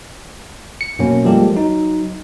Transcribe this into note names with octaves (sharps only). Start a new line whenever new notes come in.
C#7
F#2 B2 A#3 C#4
F3 G3 G#3 A#3 G4 A4
F#3 D#4